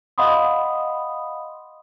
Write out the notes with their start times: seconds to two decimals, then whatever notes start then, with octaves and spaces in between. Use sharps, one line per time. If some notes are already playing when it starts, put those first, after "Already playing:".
0.18 D#5 F5 F#5 B5 C6 D#6